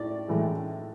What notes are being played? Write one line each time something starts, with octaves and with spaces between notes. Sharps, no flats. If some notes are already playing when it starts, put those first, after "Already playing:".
Already playing: A2 D5
A2 E3 G#3